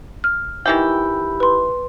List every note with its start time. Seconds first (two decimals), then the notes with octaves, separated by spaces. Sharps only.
0.24 F6
0.66 D#3 E3 E4 G4 G5 B5
1.40 B4 C6